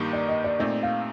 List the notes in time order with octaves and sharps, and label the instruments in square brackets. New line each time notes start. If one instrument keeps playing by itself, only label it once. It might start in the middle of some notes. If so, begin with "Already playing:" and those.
Already playing: [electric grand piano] G2 D#3 A#3 D#4 G4
[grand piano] D5
D#5
D5
[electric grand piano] A#2 A3 C4 D#4 [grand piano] D5
[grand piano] F5